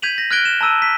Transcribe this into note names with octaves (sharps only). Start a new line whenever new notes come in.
G6 G#6 B6 D#7 F7 F#7
A#6
F6 F#6 G#6 A#6 D7 G7
E7
A5 A#5 E6 D#7
B6